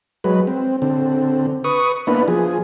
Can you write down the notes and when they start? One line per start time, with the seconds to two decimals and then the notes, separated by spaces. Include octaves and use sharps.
0.24 F#3 G#3 B4
0.47 C4
0.82 D3 C4
1.64 B4 C#6 D#6
2.07 A#3 B3 D4 E4 B4
2.28 F3 G#4